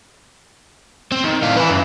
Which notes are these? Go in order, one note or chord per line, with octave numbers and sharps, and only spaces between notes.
C4
D#3
A2 F5
E4 B4
F#2